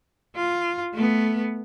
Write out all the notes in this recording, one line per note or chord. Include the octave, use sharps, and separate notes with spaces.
F4
A3 B3